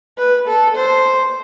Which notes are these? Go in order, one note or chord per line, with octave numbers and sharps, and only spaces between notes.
B4
A4
C5